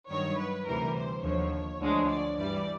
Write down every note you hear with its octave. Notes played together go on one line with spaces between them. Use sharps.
G2 D#3 F#3 C#5
B4
D2 C3 E3 G3 A#4
C5
D#2 D3 F3 C#5
D2 D3 F3 G#3
D5
G2 E3 G3 D5